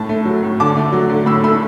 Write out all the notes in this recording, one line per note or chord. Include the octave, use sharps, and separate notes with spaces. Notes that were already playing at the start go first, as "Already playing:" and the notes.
Already playing: A2 A5
A3
F#3
A2
D3 A5 D6
A3
F#3
D3
A2 B5 E6
A3 B5 E6